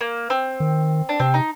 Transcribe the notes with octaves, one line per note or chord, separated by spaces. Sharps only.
A#3
C4
D#3
D4
C3 C4
D#4